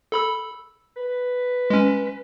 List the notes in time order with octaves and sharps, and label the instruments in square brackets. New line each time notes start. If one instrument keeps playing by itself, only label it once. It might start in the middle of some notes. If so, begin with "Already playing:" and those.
[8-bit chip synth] A4 B5 E6
[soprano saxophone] B4
[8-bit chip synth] G#3 C#4